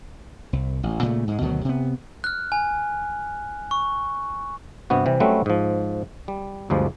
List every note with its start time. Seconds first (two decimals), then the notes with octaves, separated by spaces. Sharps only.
0.53 C2
0.83 A1
1.03 A#2 C#3 A3
1.28 G#2 G#3
1.41 D2 B2 D#3 F#3
1.65 C3 B3
2.24 F6 F#6
2.52 G#5
3.71 C#6
4.90 G2 C3 B3 F#4
5.06 C3 E3 G3
5.20 F#3 G3 A3 C4 C#4 B4
5.46 G#2 F3
6.28 G3
6.70 D2 G2 F3 G#3